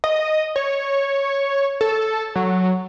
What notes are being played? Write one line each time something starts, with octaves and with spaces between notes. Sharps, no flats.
D#5
C#5
A4
F#3